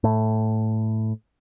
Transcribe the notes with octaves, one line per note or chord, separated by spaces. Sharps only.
A2